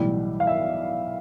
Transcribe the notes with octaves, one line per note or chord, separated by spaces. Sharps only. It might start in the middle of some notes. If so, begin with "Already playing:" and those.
Already playing: B1 A2 E3 G3
F5
E5